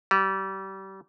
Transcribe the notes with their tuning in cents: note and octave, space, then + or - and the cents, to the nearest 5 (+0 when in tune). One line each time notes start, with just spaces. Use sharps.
G3 -30